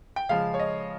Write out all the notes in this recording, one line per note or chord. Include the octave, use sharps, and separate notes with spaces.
G5
C#3 F3 G#3 F5
C#5
D#5